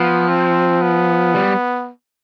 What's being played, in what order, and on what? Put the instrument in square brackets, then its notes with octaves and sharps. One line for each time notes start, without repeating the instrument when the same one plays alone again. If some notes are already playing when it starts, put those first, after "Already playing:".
Already playing: [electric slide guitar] F3 [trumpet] B3
[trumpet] C4
B3
[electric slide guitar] G3